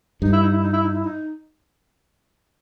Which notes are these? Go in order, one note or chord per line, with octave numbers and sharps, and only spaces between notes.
G2 D#4
E4
D#4
E4
D#4
E4
D#4
E4
D#4